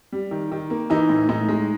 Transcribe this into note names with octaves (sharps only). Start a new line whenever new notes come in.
G3
D#3
D#3
A#3
E3 D#4
A2
A2 D#4
G#3